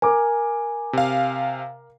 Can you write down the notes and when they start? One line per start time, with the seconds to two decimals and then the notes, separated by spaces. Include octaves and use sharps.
0.02 A#4 G#5 A#5 D6
0.93 C3 F5